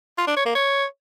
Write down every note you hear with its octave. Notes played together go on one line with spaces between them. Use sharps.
F4
D4
C#5
A#3
C#5